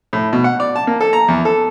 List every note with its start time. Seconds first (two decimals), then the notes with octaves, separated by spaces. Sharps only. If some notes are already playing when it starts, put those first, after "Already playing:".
0.13 A2
0.33 B2
0.44 F#5
0.60 D5
0.76 A5
0.87 A#3
1.01 A4
1.13 A#5
1.28 E2
1.45 A4